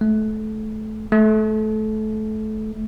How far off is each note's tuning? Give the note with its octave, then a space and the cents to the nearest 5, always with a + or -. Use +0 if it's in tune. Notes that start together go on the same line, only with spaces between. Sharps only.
A3 -25
A3 -25